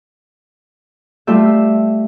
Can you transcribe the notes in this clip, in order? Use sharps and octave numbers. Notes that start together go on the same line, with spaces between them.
G3 A3 F4 G4 E5